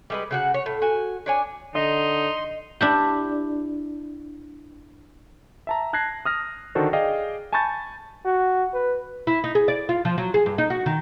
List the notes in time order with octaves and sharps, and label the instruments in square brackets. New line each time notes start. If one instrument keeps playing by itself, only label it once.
[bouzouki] G3 G#3 B4
C#3 F#4 F#5
C#5
A2
F#4 G#5
D4 C#5 G#5
[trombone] D3 [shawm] D#4 [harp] D#5 [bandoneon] C6
[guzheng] D4 E4 G4
[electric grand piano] E5 A5 A#5
A5 F#6 G#6 A#6 C7
D#6 F6 A#6
D3 D#3 D4 F#4 A4 C5
G#4 D5 D#5 F5 G5
G#5 A5 B5 C#6 G6 A6
[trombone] F#4
B4
[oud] E4
D#4
G#4
D5
F4
F3
F#3
G#4
G2
D#4
F#4
D#3